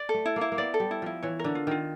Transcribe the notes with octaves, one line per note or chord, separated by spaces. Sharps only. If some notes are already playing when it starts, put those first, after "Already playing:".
Already playing: D5
A4
A3
E4
A#3
E4
A#3
B3 D5
A4
G3
E4
F3 E4
E3 C#5
D3 A#4
F4
D#3 F4